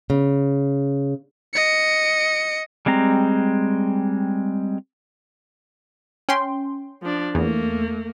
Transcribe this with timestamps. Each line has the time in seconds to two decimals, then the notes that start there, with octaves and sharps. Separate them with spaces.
0.10 C#3
1.53 D#5 C#7
2.86 G3 G#3 C4 A#5
6.29 C#4 G5 C6
7.02 F3 D4
7.35 E2 A3 A#3